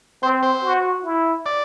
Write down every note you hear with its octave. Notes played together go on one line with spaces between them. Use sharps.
C4 C5
C5
F#4
E4
D5